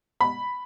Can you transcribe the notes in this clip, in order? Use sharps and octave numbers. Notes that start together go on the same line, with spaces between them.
B5